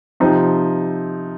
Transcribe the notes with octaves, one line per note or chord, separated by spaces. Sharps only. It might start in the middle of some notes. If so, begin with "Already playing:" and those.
C3 F3 C4 D#4